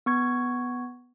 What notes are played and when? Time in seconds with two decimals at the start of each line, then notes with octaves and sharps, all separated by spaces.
0.06 B3 C#6 G#6